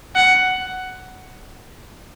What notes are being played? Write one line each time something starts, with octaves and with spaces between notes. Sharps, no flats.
F#5